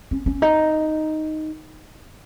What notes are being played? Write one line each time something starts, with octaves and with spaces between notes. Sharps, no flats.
C#4
C#4
D#4